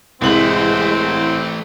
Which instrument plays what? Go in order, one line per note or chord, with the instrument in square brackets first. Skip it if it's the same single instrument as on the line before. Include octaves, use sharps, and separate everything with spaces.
[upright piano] C2 F#7 [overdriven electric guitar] E3 A3 [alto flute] G#3 [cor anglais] C4